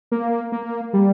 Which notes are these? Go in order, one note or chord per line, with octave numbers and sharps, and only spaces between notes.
A#3
A#3
G3